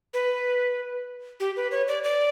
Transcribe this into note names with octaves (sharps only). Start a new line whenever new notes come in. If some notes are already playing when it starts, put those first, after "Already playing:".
B4
G4
B4
C#5
D5
D5